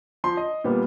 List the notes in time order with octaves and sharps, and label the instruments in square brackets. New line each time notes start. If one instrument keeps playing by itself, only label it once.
[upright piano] F3 C6
D#5
A#2 G3 B3